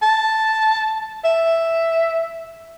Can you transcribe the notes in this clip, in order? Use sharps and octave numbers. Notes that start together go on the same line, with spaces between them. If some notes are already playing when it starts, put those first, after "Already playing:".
A5
E5